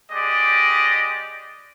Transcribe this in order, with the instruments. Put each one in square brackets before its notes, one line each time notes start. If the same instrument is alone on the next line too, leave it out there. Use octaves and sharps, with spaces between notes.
[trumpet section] G#3 G4 D5 D#5